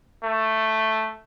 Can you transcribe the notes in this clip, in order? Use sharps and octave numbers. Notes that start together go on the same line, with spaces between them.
A3